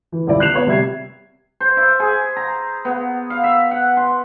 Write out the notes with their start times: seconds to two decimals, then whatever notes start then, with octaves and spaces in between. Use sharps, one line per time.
0.12 E3
0.27 D#1 C#2 E4 D5
0.40 F#6 C7 E7 F7
0.52 B3 C#5
0.66 C3 G3 E5 G#6 C7
1.60 C5
1.77 E4
2.00 G#4
2.36 A#5
2.85 B3
3.30 F5
3.44 E5
3.71 F#5
3.97 C6